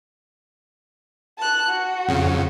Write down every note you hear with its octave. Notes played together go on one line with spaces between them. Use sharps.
A5 F#6
F#4
F2 C#3